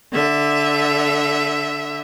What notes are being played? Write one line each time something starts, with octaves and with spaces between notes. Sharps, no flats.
D3 E5